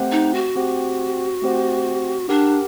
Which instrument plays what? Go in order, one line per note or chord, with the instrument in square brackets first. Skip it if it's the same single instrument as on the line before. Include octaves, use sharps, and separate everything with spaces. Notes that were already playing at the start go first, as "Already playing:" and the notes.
Already playing: [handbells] A3 C4 G4 C5 F#5
[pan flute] D#4
F#4
[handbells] A3 C4 G4 C5 F#5
A3 C4 G4 C5 F#5
[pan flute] D4 [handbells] G4 A#4 F#5